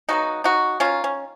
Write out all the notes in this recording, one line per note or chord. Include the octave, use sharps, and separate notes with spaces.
C#3 F#3 B3 D#4 F#4
D#4 F#4
D#3 F#3 A#3 C#4 F4
C#4